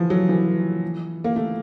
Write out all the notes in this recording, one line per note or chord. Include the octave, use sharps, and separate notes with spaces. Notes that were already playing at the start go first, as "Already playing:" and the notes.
Already playing: E3 F3
F#3
E3
A#3
A3